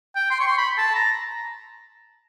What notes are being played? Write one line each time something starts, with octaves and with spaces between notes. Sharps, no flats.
G5
C6
C#6
C6
B5
A5
A#5